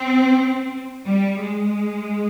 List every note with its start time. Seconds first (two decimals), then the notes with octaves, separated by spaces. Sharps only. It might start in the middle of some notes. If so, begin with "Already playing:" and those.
Already playing: C4
1.05 G3
1.39 G#3